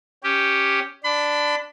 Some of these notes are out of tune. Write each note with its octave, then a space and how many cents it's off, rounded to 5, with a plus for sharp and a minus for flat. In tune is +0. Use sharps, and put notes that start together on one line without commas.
C#4 +5 G4 +0
D4 +0 B5 +35